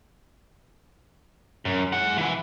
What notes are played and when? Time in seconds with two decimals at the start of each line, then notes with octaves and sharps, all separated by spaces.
1.65 F#2
1.92 G#3 F#5
2.18 E3 E4